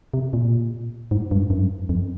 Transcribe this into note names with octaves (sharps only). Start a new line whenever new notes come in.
C3
A#2
G#2
G2
F#2
F2